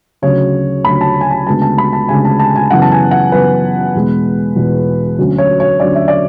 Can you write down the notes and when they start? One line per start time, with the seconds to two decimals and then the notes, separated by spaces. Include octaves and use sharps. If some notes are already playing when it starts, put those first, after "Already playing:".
0.22 D2 C#3 F#3 C#5
0.85 D2 C#3 F#3 B5
1.01 A5
1.21 G#5
1.31 A5
1.46 D2 C#3 G#3 B3 A5
1.62 A5
1.78 B5
1.93 A5
2.09 D2 C#3 G#3 B3 G#5
2.25 A5
2.39 A5
2.56 G#5
2.71 F#2 C#3 E3 B3 F#5
2.82 A5
2.92 G#5
3.11 F#5
3.32 F#2 C#3 E3 B3 B4
3.95 E2 B2 G#3 B3
4.56 E2 B2 G#3 B3
5.18 D2 D3 F#3 C#4
5.38 C#5
5.60 C#5
5.80 D2 D3 F#3 C#4 D5
5.95 E5
6.08 D5